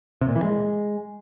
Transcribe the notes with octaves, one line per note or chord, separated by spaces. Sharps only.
C3
A#2
E3
G#3